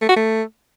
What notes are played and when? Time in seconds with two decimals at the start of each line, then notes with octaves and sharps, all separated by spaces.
0.01 A3
0.09 F#4
0.16 A3